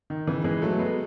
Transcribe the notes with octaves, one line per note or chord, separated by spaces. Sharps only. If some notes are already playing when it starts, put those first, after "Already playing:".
D#3
C#3 E3
E3 G#3
F#3 A3
G#3 B3